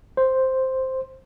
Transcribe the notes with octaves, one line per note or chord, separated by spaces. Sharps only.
C5